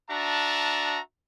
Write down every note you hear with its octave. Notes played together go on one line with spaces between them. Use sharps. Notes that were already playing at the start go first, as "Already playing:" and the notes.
D4 F#4 E5 A5 A#5